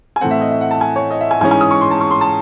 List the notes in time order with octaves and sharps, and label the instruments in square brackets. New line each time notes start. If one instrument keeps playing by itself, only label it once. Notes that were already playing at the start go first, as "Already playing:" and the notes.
[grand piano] G#5
A2 E3 A3 C4 F#5
E5
D#5
E5
F#5
A5
G#5
C#5
D#5
E5
G#5
G#2 E3 G#3 C#4 G#5
G#5
D#6
C#6
C6
A5
C#6
C6
A5